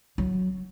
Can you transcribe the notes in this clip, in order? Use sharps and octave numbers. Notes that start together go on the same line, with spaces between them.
F#3